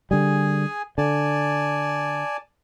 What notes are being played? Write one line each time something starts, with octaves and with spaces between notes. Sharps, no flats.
D3 G3 G#4 G#5
D3 D5 G#5 A5